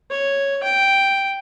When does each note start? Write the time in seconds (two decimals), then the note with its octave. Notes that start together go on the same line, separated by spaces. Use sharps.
0.11 C#5
0.63 G5